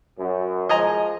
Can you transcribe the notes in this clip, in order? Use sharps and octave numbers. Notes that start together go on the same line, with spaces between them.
F#2
F3 G#3 D#5 G#5 A#5